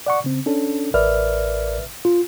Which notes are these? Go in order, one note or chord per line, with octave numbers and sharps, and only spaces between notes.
D5 F#5 C#6
C#3 C4
C#4 D4 A4
A1 A#4 B4 D5 E5 F6
F4